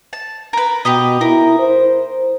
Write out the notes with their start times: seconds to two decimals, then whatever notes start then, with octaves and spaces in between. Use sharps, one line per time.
0.13 A5
0.53 A#4 B4
0.85 B2 G4 B4 D#5
1.21 E4 A#4
1.59 C5